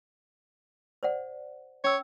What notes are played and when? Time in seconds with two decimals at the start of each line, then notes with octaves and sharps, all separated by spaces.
1.03 C5 D5 F#5
1.84 C#4 C#5 E6